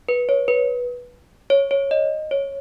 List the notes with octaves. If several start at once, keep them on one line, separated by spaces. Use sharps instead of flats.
B4
C#5
B4
C#5
C#5
D#5
C#5